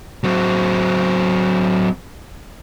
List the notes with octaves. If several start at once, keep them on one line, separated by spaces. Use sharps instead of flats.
F#3 C4